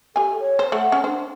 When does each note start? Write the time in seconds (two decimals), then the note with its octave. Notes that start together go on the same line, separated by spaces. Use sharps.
0.16 G4 A4 G#5
0.40 C#5
0.59 C5
0.72 A3 F#5
0.92 C#4
1.04 D4 C5